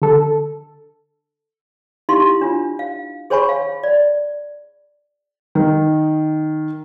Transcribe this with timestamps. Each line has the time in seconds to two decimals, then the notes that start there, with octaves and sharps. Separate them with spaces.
0.02 D3 A4
2.09 D#4 E4 G4 F5 C6
2.41 D4 F4
2.79 F5
3.30 G#4 C5 C#5 G#5 B5 C#6
3.49 F5
3.83 D5
5.55 D#3